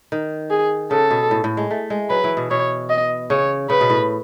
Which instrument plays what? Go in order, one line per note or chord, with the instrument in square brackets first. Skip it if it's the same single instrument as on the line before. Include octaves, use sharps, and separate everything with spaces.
[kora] D#3
[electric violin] G#4
[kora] C#3 [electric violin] A4
[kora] B2
A2
A2
G#3
A3
G#3
[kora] F#3 [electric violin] B4
[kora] E3
B2
[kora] B2 [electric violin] C#5
[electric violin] D#5
[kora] C#3 [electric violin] C#5
[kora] C#3 [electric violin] B4
[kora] B2
A2